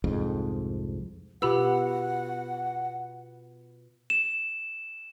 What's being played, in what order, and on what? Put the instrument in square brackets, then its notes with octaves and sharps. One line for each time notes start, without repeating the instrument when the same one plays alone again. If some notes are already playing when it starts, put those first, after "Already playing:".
[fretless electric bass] C2 F2 G#2
[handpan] B2 F4 B4 [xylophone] G4 B5 E6 [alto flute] F#5
[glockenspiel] E7